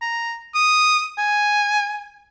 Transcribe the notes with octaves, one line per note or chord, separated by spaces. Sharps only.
A#5
D#6
G#5